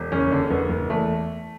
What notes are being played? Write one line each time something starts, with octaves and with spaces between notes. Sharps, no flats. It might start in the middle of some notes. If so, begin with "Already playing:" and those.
Already playing: E1
F#1 C#4
D3
F#1 B3
F#1
E2 A3